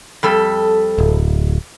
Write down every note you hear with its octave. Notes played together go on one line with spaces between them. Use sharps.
F2 G3 A4
D1